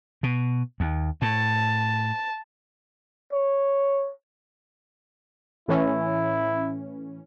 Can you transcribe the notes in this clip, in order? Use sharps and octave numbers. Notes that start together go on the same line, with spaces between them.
B2
D#2
A2 A5
C#5
A2 E3 C#4 E4